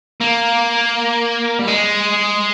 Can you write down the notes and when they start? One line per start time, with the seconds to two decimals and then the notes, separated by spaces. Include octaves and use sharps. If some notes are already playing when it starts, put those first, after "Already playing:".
0.21 A#3
1.59 G3
1.67 G#3